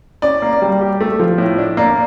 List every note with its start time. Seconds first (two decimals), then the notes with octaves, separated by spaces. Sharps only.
0.22 C#4 D5
0.42 A#3
0.62 G3
0.81 G4
1.01 A3
1.19 F3
1.38 A2
1.58 D4
1.77 A#3 D5